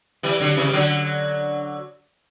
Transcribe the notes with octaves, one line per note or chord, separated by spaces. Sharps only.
E3 G3
D3 F#3
C#3 E3
G3
D3 F#3